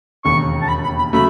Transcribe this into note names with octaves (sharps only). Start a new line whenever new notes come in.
E1 D#2 C#3 C#6
A5
B5
B5
B5
C#3 F#3 A3 B5